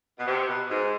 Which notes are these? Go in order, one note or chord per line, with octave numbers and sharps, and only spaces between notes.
B2
C3
B2
G#2